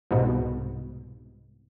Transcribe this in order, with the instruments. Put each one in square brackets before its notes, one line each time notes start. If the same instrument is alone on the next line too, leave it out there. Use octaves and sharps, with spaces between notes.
[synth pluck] C2 G#2 B2